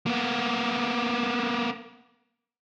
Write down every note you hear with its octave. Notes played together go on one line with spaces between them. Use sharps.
A#3 B3